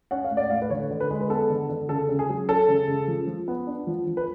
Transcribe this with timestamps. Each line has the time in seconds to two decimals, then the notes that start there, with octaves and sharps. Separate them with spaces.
0.11 C#4 F#5
0.25 F5
0.31 A2
0.37 D5
0.50 A2 F5
0.62 B4
0.70 D3 C#5
0.90 D3
1.00 B4
1.10 G#3
1.21 B4
1.30 B3 A4
1.50 D3
1.70 D3
1.89 C#3 A4
2.09 C#3
2.19 G#4
2.29 F#3
2.48 C#4 A4
2.68 C#3
2.88 C#3
3.08 F3
3.27 F3
3.48 B3
3.67 D4
3.87 F3
4.07 F3
4.17 B4